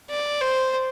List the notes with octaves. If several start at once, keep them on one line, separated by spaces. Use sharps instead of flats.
D5
C5